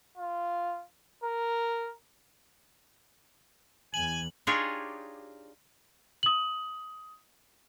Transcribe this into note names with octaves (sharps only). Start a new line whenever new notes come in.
F4
A#4
E2 E3 G#5 F#7
D4 D#4 F4 G4 G#4 C#5
D#6 F#7